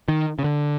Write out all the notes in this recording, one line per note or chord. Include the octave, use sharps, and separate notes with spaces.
D#3
C#3
D3